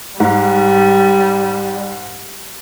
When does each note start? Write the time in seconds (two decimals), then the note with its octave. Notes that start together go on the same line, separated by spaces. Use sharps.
0.20 G#2 G3